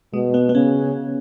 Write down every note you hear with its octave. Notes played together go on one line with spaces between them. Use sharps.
B2 G#3
B3
B3
C#3 C#4